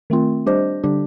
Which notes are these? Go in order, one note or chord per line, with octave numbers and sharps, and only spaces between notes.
D#3 A3 C4 F4
G3 D4 G4 C5 D#5
D3 G3 D4 G4